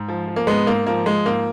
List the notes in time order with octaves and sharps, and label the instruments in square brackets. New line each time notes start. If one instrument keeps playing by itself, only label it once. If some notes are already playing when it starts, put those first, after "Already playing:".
Already playing: [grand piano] G#2
F3
F3
A#3
G#2 G#3 B3
G#2 A#3
F3 A#3
F3 G#3
G#2 A#3